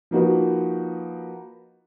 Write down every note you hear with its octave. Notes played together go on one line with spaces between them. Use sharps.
F3 A#3 D#4 F#4 B4